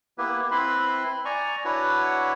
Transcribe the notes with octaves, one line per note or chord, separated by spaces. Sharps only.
A#3 B3 E4 G4 B4
C4 E4 B4 B5 C6
D5 G#5 A#5 C#6
D4 E4 F#4 B4 C#5 F#5